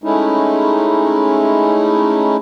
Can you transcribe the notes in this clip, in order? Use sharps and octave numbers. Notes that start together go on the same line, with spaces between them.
G#3 A3 C#4 D#4 E4